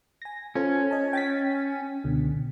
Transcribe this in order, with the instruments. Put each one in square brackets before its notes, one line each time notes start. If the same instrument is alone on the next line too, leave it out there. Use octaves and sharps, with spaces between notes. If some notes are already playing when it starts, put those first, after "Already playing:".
[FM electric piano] G#5 A#6
[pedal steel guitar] C#4 [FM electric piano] F4 A4 C5
[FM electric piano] D#5 A5
G5 A6 B6
C#2 B2 D3